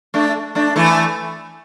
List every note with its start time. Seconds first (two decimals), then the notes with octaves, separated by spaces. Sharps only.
0.14 A3 D4
0.55 A3 D4
0.76 E3 A3